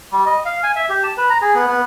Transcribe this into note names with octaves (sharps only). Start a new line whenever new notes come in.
G3
D#5
F5
G#5
E5
G4
A5
B4
A#5
G#4
B3
B3